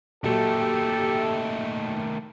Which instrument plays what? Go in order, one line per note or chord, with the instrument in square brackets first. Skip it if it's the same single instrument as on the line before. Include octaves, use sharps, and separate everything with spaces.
[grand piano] A#2 F#3 [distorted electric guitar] D#3 A3 [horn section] G4 A4